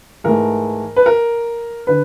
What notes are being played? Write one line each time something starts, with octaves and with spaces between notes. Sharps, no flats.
G#2 E3 A3 A#4
B4
A#4
D3 B4